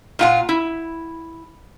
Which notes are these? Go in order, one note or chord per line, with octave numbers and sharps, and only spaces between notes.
A#2 F4 F#5
E4